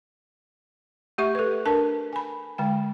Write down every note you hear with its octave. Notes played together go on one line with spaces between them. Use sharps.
A3 G4 E5 C#6
A4 B4
D4 A#4 A5
G#5 B5
D3 G#3 G5